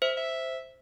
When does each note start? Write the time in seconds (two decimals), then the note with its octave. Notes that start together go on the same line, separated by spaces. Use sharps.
0.02 C5 E5
0.17 E5